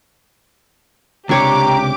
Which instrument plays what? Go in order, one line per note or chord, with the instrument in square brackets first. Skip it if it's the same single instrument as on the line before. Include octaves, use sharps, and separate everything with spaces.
[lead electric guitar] C#2 C3 [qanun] D4 C#5 [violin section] G4 D6 [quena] A#5